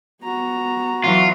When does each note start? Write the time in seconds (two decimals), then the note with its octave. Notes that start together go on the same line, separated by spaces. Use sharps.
0.23 B3 F#4 A#5
1.04 E3 F#3 F4